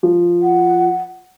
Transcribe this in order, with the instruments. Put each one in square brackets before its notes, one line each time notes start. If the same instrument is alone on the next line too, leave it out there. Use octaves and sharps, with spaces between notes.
[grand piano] F3
[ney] F#5